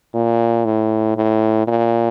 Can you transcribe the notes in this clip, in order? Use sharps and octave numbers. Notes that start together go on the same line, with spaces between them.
A#2
A2
A2
A#2